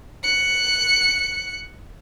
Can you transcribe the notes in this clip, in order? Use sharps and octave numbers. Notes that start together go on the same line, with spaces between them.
F#6 C#7